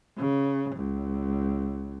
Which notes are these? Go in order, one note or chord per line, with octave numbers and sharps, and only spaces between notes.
C#3
C#2